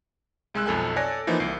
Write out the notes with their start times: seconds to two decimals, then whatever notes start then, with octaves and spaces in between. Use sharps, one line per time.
0.54 C2 G#3 G#5 E6 F#6
0.66 B1 F2 A4 G#5 F#6
0.96 A4 C#5 D5 G#5 F#6 A#6
1.27 E3 F3 A#3 D#4
1.40 C2 C7